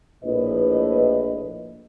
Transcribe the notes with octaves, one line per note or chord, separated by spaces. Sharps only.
A#1 A2 B4 D#5